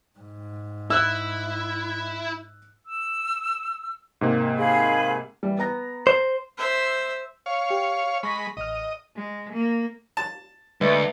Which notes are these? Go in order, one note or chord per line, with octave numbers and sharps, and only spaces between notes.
G#2
E4 E6 F#6
E6
G#2 C3 A#3
G#4 F5 B5
E3 G3
B3 A#5 A#6
C5
C5 E5
C#5 F5
G4
G#3 B5 C#6 A#6 B6
A1 D#5 F6
G#3
A#3
A5
D2 G#3 B4 E5